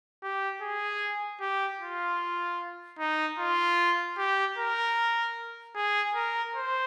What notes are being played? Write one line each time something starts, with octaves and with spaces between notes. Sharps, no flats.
G4
G#4
G4
F4
D#4
F4
G4
A#4
G#4
A#4
C5